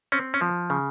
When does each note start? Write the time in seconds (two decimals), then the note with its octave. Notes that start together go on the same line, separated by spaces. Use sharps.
0.12 C4 C#4
0.34 C#4
0.41 F3
0.70 C#3